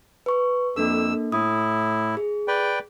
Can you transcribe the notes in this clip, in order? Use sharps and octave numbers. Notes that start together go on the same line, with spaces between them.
B4 C#6
F2 A#3 D4 A4 E6
A2 E4 D#6
G#4
B4 D5 G5